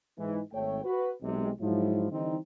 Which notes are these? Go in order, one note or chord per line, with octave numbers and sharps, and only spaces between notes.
G#2 E3 G#3 D#4
G#1 A3 C#5 G5
F#4 B4
B1 C3 G#3
G#2 F3 F#3 E4
D3 E3 G3 C4 D#4